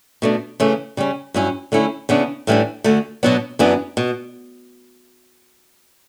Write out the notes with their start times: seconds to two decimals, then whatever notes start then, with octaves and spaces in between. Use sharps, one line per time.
0.22 B2 A3 D4
0.60 C#3 E3 A3 C#4
0.97 C#3 G3 C#4
1.34 G2 F#3 C#4 E4
1.72 D3 A3 C#4 E4
2.09 C#3 E3 B3 D4
2.47 A2 E3 G3 B3 D4
2.84 D2 D3 A3
3.23 B2 F#3 B3 D4
3.59 F#2 E3 B3 D4
3.97 B2